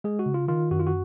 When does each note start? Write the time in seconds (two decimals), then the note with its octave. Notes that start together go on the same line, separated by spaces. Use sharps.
0.04 G#3 G#4
0.19 F#4
0.26 C#3
0.34 F4
0.48 D#3 F4
0.71 F#2 F#4
0.80 F4
0.87 F#4